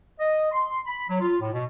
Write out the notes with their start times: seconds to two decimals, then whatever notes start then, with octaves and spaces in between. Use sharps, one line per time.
0.20 D#5
0.52 C6
0.86 B5
1.09 F#3
1.21 F4
1.41 A2
1.53 B2